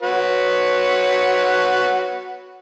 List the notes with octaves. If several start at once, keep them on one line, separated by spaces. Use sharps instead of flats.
F#4 B4 C#5